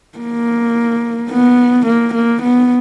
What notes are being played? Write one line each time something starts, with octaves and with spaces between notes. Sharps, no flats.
A#3
B3
A#3
A#3
B3